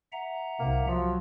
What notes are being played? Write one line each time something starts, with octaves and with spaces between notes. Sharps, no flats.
E5 F#5 A#5
C2 C3 A#3
F3 F#3